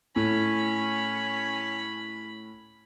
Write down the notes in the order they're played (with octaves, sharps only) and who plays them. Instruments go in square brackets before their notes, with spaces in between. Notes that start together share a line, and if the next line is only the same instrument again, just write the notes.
[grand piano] A2 [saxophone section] C#4 [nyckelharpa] B5